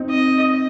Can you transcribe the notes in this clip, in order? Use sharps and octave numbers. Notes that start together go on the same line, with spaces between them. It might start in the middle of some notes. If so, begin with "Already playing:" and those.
Already playing: C4 D#4
D#5